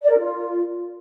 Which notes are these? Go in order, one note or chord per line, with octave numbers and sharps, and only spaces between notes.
D5
A#4
F4